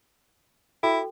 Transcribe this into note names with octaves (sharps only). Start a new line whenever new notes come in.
E4 F#4 A4 G5